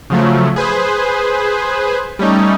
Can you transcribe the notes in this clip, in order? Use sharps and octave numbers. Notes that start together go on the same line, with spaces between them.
C#3 F3 F#3 A3
G#4 B4 C5
G3 A3 C#4 D#4